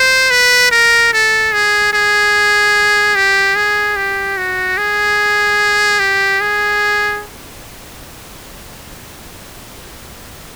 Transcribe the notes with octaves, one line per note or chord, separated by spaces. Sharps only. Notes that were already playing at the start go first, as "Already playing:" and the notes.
Already playing: C5
B4
A#4
A4
G#4
G#4
G4
G#4
G4
F#4
G#4
G4
G#4